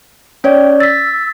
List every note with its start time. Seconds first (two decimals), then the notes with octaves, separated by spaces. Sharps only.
0.44 C#4 C#5 D5 G5
0.80 E6 A6 B6